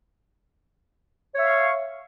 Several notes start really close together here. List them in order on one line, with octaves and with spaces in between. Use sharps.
C#5 E5 F5 C#6